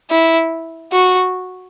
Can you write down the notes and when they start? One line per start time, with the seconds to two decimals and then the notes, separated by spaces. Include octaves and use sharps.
0.11 E4
0.93 F#4